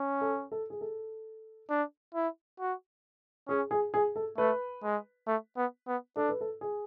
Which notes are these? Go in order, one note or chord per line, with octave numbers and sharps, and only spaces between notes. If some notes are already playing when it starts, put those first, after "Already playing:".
Already playing: C#4
A4
A4
G#4
A4
D4
E4
F#4
C#4 G#4
G#4
G#4
A4
A3 B4
G#3
A3
B3
B3
D4 A4
B4
A4
G#4